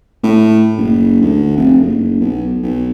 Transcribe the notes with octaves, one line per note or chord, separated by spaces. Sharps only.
A2
F#1
D2
F1
F#1
B1
B1